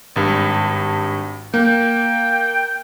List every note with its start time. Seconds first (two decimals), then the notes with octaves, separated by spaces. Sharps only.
0.16 G#1 G2
1.54 A#3 G5